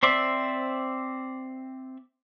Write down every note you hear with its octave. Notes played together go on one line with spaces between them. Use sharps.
C4 C5 D5 E5